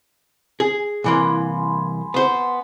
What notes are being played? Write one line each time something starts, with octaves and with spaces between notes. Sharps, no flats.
G#4
C2 E3 A#3 G#5 B5 C6
B3 C5